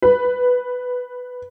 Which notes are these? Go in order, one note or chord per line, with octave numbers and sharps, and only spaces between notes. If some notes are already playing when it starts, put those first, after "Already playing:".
B4